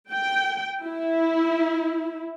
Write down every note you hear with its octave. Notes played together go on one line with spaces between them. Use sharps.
G5
E4